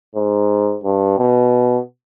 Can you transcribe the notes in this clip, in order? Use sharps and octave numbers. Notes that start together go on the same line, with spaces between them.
G#2
G2
B2